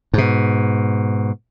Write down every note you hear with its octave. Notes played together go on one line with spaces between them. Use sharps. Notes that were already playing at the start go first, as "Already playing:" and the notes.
G#2 B2